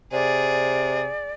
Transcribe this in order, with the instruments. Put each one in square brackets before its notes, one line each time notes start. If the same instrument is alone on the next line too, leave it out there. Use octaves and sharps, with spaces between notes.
[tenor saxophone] C3 [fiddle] G#4 [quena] D5